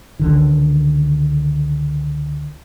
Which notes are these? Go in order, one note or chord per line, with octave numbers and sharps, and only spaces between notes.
C#2 D3 D#3